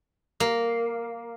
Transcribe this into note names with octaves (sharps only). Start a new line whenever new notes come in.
A#3